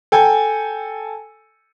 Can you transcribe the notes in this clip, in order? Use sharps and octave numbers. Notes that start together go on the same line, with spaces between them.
A4 G5 G#5